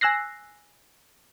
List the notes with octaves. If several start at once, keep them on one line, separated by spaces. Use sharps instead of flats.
G#5 E6 F#6 A#6 C7